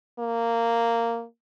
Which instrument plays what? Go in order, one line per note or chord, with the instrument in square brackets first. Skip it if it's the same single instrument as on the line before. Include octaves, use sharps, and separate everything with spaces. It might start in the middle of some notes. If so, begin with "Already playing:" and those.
[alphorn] A#3